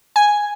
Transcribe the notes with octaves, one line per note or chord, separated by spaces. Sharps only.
G#5